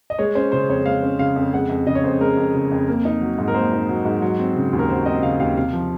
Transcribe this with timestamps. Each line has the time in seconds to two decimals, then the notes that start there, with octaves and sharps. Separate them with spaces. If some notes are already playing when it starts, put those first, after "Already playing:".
0.10 D#5
0.19 G#3 C#5
0.35 C#4 C5
0.52 C#3 C5
0.69 F2 C#5
0.86 G#3 F5
1.03 C#4
1.19 C#3 F5
1.36 F2
1.54 G#3 F#5
1.69 F2
1.86 C#3 D#5
1.95 C#5
2.04 F2 C5
2.21 G#3 A#4
2.37 F2
2.54 C#3
2.71 F2
2.88 A#3
3.05 D#4
3.21 F#3
3.39 G#2
3.48 A#4
3.54 A#3 C5
3.72 D#4
3.89 F#3
4.05 G#2
4.22 F#3
4.39 C4
4.56 C#3
4.73 D#2
4.79 A#4
4.89 F#3 C5
5.06 C4 D#5
5.23 C#3 F5
5.40 D#2 F5
5.57 C3 F5
5.73 F3